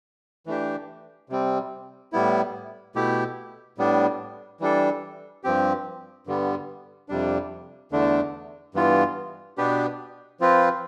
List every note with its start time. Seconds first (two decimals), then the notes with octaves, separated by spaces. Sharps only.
0.46 E3 A3 D4 G4
1.29 C3 G3 C4
2.12 A2 G3 B3 E4
2.95 B2 A3 E4 G4
3.78 A2 G3 B3 D4
4.60 E3 G3 D4 A4
5.44 G2 F3 C4 G4
6.27 G2 D3 G3 B3
7.09 F2 C3 G3 D4
7.92 E2 D3 A3 D4
8.75 G2 E3 B3 F4
9.58 B2 B3 D4 G4 B4
10.40 F3 C4 F4 B4